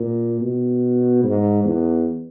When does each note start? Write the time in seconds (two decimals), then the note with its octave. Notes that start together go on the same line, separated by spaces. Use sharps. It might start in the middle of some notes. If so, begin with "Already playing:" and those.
Already playing: A#2
0.41 B2
1.24 G#2
1.65 E2